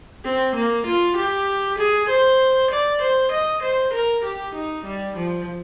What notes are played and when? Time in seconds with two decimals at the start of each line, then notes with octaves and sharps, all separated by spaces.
0.25 C4
0.55 A#3
0.86 F4
1.16 G4
1.78 G#4
2.09 C5
2.70 D5
3.01 C5
3.31 D#5
3.62 C5
3.93 A#4
4.24 G4
4.55 D#4
4.85 G3
5.16 F3